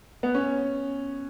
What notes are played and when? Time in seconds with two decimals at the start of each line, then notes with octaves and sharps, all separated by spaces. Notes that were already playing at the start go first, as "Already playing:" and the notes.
0.23 B3
0.35 C#4